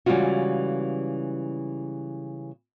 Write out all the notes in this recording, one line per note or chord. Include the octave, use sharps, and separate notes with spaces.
C#3 E3 G3 G#3 F4 F#4